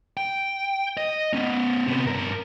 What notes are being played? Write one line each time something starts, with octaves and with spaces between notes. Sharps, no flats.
G5
D#5
B3 C#4
C3 B3
G2 A#4